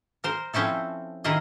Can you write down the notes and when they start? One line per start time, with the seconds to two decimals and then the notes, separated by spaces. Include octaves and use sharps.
0.24 A#4 C5
0.53 F3 C4 C#4 E4 A4
1.24 D#3 E4 F4 G#4 D#5